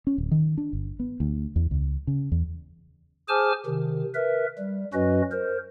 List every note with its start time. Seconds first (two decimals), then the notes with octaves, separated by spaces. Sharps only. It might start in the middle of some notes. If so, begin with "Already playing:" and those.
0.07 C#4
0.18 D1
0.31 D#3
0.57 D4
0.73 G1
0.99 B3
1.20 D2
1.56 E2
1.71 C#2
2.07 C#3
2.32 E2
3.29 G#4 C5 G#5 A5 D6 F6
3.66 C3 D#3
4.15 A#4 B4 E5
4.58 G3
4.93 F#2 F#3 C#4 F#4 B4 D#5
5.31 A#4 C5